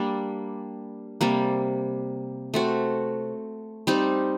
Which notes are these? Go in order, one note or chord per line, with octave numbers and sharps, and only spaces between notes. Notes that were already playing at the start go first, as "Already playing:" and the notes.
Already playing: G3 A#3 D4
C3 G3 A#3
A3 C4 F#4
G3 C4 D#4 G4